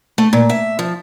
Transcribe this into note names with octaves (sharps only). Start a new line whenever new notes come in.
A3
A#2
E5
F3